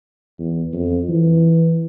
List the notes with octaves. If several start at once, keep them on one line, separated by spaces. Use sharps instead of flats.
E2
F2
E3